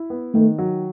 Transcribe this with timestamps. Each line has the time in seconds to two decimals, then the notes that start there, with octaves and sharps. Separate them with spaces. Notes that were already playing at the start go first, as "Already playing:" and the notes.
Already playing: E4
0.10 B3
0.34 D#3 A3
0.58 F#3